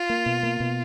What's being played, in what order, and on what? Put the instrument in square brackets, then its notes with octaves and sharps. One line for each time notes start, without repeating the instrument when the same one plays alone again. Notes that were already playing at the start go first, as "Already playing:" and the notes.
Already playing: [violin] F4
[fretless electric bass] A#3
B2
A#3
B2